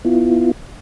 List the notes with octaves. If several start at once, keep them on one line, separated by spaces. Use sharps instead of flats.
B3 E4 F4